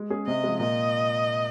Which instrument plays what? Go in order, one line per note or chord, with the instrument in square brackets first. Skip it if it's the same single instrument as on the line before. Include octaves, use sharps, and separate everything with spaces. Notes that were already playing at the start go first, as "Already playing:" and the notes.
Already playing: [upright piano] G#3
C#4 G#4
[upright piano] C3 [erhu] D#5
[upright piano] F3 G#3
[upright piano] A#2 [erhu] D#5